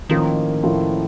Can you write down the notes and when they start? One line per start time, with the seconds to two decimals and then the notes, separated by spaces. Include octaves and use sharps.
0.09 A2 D#3 F3 A#3 C#4 F4
0.63 A2 F3 A#3 C#4 F4